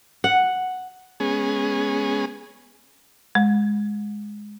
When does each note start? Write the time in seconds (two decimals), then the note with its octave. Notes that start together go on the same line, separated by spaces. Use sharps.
0.24 F#5
1.20 G#3 B3 C#4 G#4
3.35 G#3